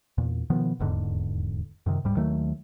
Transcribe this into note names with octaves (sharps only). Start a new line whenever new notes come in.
E2 A#2
B2 D#3 F3 B3
D#1 E2 G#2 D3
F#2 C3 D#3
D1 G#2 G3
D#2 D#3 F#3 A3